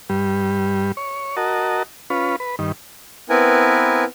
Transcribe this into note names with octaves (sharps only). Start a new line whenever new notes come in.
G2 G3
C#5
F#4 A#4 D#5 A5
C#4 F4 B4
B4
G2 D#3
B3 C4 E4 A#4 B4 G#5